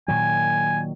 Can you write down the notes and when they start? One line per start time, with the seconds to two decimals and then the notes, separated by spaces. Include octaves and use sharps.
0.08 A#2 D#3 F#3 G#5